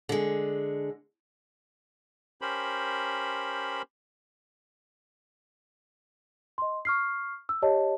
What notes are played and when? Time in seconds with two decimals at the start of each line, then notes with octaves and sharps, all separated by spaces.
0.09 D3 G#3
2.41 C#4 G4 A#4 C5 B5
6.58 D#5 C6
6.85 C#6 F6 C7
7.49 E6
7.62 G4 C#5 D#5 A5